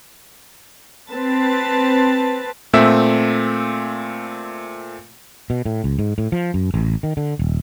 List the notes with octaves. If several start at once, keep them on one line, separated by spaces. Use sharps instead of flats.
C4 B4 A5
A#2 A3 C4 E5 E6
B2
A2
C#2
G#2
A2
F3
F#2
A1
D#3
D3
D#1